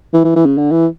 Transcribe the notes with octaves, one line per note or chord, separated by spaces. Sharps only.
E3
E3
E3
C#3
D3
E3